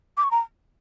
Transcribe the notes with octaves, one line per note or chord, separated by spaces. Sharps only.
D6
C#6
A#5